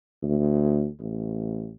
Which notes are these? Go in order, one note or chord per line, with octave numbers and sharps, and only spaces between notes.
D2
A1